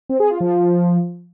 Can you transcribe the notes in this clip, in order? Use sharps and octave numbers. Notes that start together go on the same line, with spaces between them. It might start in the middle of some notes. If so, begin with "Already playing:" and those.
C4
G#4
F4
F3